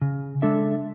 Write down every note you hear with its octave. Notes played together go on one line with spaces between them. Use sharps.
C#3
G#3 D4 A4 E5